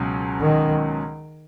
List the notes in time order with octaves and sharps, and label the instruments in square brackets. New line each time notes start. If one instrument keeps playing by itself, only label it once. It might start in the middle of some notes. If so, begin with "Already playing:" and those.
Already playing: [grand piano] C#2 B2 F#3 C#4
[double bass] D#3